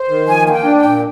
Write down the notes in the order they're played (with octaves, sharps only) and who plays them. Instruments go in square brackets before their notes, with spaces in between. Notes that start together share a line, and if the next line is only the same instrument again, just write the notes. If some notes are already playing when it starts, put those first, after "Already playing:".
Already playing: [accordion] C5
D#3
[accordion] F3 [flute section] G#5
[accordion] A#3 [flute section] G#5
[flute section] G5
[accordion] D4
[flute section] G5
[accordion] A#2